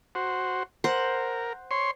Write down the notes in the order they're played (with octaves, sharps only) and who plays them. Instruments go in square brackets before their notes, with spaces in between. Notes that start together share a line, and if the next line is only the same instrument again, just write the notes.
[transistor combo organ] F#4 C5
[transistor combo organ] A#4 [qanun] C5 F#5
[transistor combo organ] C#5 C6